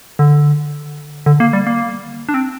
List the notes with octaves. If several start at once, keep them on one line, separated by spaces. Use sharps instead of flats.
D3
D3
A#3
G3
A#3
D4
C4